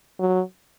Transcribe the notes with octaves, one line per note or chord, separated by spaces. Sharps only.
F#3